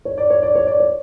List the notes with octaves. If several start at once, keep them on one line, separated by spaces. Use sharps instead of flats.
C#5
D5
C#5
D5
C#5
D5
C#5